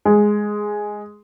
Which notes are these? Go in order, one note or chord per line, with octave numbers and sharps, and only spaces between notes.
G#3